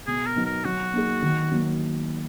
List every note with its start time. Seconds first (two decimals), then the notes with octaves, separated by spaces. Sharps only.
0.07 B2 G#4
0.26 A#4
0.36 F#3 B3 D#4
0.46 A#4
0.65 F#3 F#4
0.93 A#3 D#4 G#4
1.22 D#3
1.51 F#3 A#3